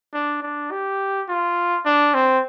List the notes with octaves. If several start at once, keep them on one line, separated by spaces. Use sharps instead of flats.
D4
D4
G4
F4
D4
C4